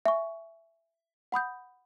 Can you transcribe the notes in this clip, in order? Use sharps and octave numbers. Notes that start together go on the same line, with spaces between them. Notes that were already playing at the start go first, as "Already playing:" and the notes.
E5 G#5 C#6
F#5 B5 D#6 G6